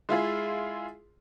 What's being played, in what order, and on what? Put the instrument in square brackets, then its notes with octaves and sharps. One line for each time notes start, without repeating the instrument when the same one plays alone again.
[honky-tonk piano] G#3 E4 F4 G#4